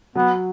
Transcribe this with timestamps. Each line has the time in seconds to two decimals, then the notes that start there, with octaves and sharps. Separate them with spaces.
0.15 F#3 B3